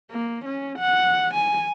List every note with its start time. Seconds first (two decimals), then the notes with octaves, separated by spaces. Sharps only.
0.11 A#3
0.45 C#4
0.79 F#5
1.34 G#5